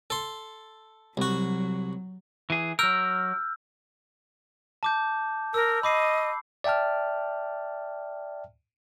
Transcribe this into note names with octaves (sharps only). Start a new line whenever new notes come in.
A4 C6
C2 F#3 F#4
E3 G#4
F#3 A#4 E6 F6 G6
A5 D6 G6
A#4 E6
D#5 B5 D6 C7
D5 E5 G5 A5 F6